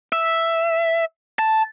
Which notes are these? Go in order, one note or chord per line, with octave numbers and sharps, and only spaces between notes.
E5
A5